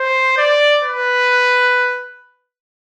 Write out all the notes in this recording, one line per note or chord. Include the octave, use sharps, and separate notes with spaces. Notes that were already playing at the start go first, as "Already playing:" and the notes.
Already playing: C5
D5
B4